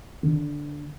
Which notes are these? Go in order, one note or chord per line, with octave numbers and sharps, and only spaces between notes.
D3